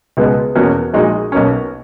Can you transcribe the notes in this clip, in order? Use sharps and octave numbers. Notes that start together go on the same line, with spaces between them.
C#2 B2 G#3 B3
E2 B2 A#3 C#4 F#4
A#1 A#2 G#3 D#4 F#4
B1 B2 A#3 C#4